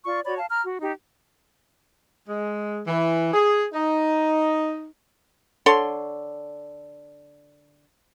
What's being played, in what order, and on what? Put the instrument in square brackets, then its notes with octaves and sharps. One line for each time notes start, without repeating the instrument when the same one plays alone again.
[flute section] F4 D5 C#6
F#4 C#5 D5 B5
F5 A5
A#5 F6
F#4
D#4 G4
[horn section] G#3
E3
G#4
D#4
[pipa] D3 A4 C#5 C6